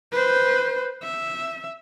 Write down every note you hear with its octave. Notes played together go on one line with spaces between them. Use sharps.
B4 C5
E5